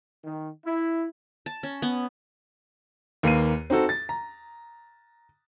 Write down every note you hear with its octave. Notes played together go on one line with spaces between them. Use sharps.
D#3
E4
A5
C#4
B3
D#2 A#3 B4 C7 D#7
C4 D#4 F#4 A4
A6
A#5